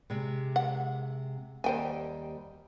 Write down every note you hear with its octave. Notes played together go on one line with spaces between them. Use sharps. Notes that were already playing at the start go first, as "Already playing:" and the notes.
C3 G#3
F#5
D#2 G3 C5 G5 G#5